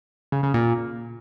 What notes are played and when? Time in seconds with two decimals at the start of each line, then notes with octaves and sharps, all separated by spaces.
0.32 C#3
0.43 C#3
0.54 A#2